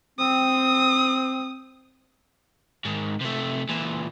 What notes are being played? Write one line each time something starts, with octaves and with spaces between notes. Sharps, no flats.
C4 D#6
G#2 D#3
C3 A3
A#2 E3